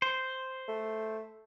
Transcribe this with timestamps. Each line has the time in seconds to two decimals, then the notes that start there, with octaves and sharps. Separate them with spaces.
0.02 C5
0.68 A3